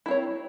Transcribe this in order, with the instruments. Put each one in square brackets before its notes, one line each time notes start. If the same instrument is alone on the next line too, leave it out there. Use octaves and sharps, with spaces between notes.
[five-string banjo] E4
C4
C#5